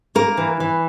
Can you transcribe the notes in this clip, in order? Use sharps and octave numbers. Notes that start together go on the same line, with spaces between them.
A#3 A#4
E3
E3